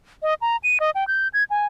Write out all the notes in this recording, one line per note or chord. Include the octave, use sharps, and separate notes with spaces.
D#5
A#5
D#7
D#5
G5
G6
G#6
G#5